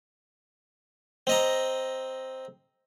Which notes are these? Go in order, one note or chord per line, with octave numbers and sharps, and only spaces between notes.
C4 D#5 A#5